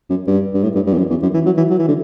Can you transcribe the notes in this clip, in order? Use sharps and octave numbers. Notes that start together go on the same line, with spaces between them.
F#2
G2
G2
A2
G2
G2
E2
F#2
E2
F#2
E3
F#3
E3
F#3
E3
D3